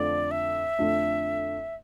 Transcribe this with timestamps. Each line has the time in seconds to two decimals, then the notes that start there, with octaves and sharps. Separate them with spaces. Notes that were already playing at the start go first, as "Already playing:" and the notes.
Already playing: F2 D3 A3 D4 F4 D5
0.31 E5
0.79 F2 D3 A3 D4 F4